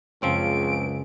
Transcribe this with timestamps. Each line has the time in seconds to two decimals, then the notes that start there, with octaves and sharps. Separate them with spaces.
0.22 C#2 F#2 C#3 F3 G#3 C4 C#4 D7